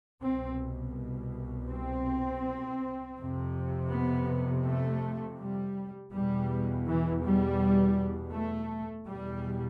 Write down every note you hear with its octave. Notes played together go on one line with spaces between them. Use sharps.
C2 B2 C4
C4
F2 C3
B3
A3
G3
E2 B2 G3
E3
G3
A3
E2 B2 G3